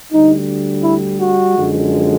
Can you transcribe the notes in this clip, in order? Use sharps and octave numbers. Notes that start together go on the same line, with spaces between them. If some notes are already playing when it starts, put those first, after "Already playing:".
D2 D3 G3 D#4
E4
F#4
F#2 D3 F3 G#3